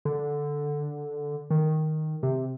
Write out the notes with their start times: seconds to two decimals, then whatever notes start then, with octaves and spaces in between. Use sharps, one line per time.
0.05 D3
1.50 D#3
2.23 C3